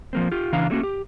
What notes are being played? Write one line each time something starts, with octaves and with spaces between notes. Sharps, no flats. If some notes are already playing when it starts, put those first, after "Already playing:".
F3 A#3 C4
F4 G4
C#3 E3 D4 F5 A#5
F#3 A3 A#3 C#4 F#4
G4